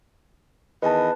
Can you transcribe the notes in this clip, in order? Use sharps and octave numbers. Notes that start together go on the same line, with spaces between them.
E2 D#3 B4 D#5 A5